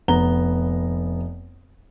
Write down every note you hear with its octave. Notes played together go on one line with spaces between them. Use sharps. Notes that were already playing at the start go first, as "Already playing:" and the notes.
F1 B3 A#5 G7